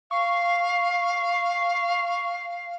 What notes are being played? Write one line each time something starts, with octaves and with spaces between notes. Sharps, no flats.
F5 C#6